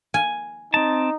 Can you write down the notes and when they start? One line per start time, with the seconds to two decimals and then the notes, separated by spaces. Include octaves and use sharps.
0.14 G#5
0.74 C4 D#4 A5